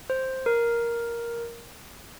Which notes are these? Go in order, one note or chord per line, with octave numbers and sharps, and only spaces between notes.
C5
A#4